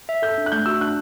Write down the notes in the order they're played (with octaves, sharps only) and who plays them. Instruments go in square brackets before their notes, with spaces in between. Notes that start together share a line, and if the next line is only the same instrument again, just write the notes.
[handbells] E5
[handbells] A4 [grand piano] G6
[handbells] D4
[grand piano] F#6
[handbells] A3 [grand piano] G6
[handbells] F#4 [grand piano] E6
[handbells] D4 [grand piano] F#6